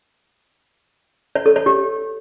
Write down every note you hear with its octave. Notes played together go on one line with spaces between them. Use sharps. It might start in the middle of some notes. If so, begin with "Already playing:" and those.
C#5
A4
C#5
G4